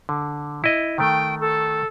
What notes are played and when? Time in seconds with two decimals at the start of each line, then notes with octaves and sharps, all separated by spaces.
0.09 D3
0.64 E4 D#5
0.98 D#3 A3 G5
1.41 A4